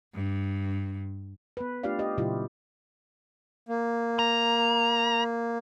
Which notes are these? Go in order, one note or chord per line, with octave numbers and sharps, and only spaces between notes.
G2
B3 B4
A3 D4 F4 G4 D5 F5
G4 D#5
A#2 C#3 F#3 E4 F4 G4
A#3
A#5